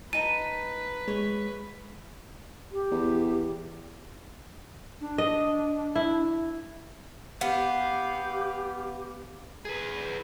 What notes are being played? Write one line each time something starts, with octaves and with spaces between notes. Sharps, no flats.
D#4 B4 A5 D#7
G#3 C#5
G4
E2
D4
D#5
E4
B3 G4 F5
G#4 B4